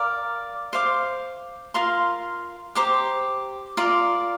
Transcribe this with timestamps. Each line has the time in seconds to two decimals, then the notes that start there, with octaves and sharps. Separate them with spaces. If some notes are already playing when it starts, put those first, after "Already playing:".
Already playing: A#4 D5 F5
0.73 C5 F5 D6
1.74 F4 A#4 F5 C6
2.75 G4 C5 A#5 D6
3.77 F4 A#4 D5